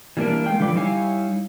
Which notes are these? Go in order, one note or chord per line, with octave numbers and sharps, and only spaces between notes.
E3 G3 A#3 B3 D4 A#4
G#3 F5 G5
D3 F3 B4 D5
G3 D#4 E4 C#5 F5 G#5